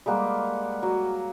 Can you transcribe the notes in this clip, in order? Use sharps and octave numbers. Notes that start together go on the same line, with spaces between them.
G3 G#3 A#3 F#5
F#3